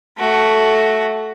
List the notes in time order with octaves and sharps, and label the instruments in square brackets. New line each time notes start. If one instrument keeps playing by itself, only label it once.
[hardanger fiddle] A3 F#4